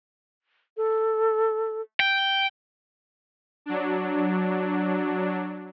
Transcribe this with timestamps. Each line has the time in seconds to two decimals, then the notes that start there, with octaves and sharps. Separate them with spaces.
0.77 A4
2.00 G5
3.66 F#3 D4